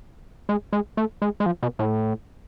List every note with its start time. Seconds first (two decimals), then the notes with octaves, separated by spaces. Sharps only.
0.49 G#3
0.73 G#3
0.97 A3
1.22 G#3
1.40 G#3
1.46 F3
1.63 B2
1.79 A2